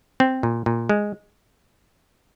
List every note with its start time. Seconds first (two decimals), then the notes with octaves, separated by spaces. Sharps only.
0.20 C4
0.43 A#2
0.66 A#2
0.89 G#3